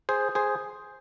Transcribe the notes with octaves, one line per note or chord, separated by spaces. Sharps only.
G#4 C5
G#4 C5